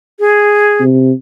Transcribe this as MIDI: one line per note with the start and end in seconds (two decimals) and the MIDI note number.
0.19 0.83 68
0.80 1.12 48